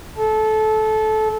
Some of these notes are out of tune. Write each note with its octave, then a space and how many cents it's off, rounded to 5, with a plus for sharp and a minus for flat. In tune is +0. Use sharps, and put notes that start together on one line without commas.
A4 -20